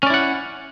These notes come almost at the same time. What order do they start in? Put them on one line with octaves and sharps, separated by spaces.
C#4 D5 E4 F#5